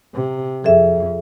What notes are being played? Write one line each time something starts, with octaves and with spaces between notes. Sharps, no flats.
C3
F2 G#4 A4 E5